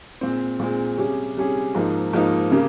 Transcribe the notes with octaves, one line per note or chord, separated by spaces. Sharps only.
A#2 G#3 C4
A#2 G#3 C4
C3 G3 C#4 G#4
C3 G3 C#4 G#4
G#2 F3 A#3 D#4
G#2 F3 A#3 D#4
C#3 G3 A#3